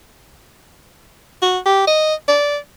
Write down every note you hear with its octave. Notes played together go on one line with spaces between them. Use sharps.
F#4
G4
D#5
D5